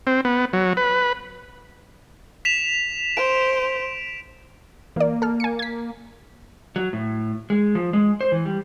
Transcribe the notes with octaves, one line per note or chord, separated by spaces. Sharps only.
C4
B3
F#3
B4
B6 E7 F7
C5 D7
E3 A#3 D5
A4 F6
G#5 C#7
G#6 B6
F#3
A2
G#3
F3
G#3
C5
E3
G3